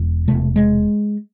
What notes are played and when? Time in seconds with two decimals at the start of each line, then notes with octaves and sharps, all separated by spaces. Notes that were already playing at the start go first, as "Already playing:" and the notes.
Already playing: E1 E2
0.28 E1 E2 C3 A3
0.56 G#3